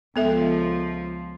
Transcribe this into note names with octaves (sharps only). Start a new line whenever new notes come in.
C#2 F3 B3 A4 E5